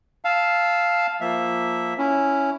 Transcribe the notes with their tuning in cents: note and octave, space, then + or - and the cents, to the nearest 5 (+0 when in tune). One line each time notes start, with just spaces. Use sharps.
F5 +0 A5 -15 E6 +0
F3 +0 A#3 +0 E5 +0
C#4 +0 E4 +0